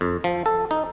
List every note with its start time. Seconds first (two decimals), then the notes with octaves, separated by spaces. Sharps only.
0.01 F2
0.24 F3
0.46 A4
0.71 D#4